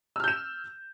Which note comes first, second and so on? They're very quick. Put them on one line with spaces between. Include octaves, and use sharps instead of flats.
E6 F6 G6 E7